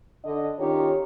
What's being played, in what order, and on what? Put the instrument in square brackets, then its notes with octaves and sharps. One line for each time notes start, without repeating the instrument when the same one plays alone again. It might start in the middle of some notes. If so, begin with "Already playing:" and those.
[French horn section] D3 D#5
D#3 C#4 D#4 F4 G4 C#5